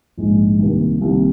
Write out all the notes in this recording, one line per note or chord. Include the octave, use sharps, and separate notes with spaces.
A#1 G#2 G#3
C2 C3 D#3 A#3
C2 C3 D#3 A#3